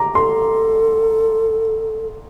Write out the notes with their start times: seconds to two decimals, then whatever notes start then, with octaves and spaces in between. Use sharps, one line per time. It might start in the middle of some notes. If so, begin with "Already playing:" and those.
Already playing: A#5 D6
0.15 A4 C6